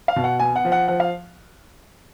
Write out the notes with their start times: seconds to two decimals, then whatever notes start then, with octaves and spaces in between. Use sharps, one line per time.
0.08 F5
0.16 B2
0.24 F#5
0.40 B3 G#5
0.56 F#5
0.65 F3
0.72 F#5
0.88 F3 F#5
1.00 F5